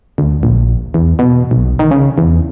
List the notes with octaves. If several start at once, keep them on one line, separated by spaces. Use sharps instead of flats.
D2
A#1
E2
B2
B1
D#3
C#3
E2